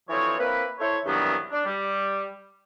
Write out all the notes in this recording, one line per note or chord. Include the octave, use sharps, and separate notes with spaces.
D2 E3 F3 C4 C#5
A#3 C4 E4 B4
E4 A4 C5 C#5
C2 G2 D#3 E3 F#3 B3
D4
G3